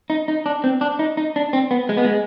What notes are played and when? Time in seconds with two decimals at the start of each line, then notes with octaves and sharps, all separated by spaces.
0.10 D#4
0.28 D#4
0.46 D4
0.64 C4
0.81 D4
0.99 D#4
1.17 D#4
1.36 D4
1.53 C4
1.71 B3
1.89 G#3
1.97 B3
2.05 G#3